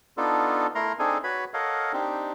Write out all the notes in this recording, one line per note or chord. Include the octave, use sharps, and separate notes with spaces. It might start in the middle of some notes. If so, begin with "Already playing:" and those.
B3 D4 D#4 F4 A4
A3 E4 A#4 A#5 C6
C4 D4 D#4 G#4 A4 G#5
F#4 B4 C#5 B5
A4 A#4 C#5 D#5 F5 F#5
C4 D4 D#4 G4